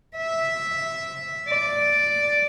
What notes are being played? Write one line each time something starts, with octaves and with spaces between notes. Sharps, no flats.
E5
D5